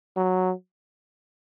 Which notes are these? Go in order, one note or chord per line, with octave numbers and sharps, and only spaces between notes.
F#3